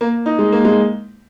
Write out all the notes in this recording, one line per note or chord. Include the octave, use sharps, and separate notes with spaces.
A#3
D#4
G#3
A#3
G#3